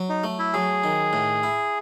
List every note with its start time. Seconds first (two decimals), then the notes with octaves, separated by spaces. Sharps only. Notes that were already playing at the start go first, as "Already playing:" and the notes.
Already playing: F#3
0.09 D#4
0.24 A3
0.39 E4
0.53 F#3 G#4
0.84 D#3
1.13 A2
1.43 E4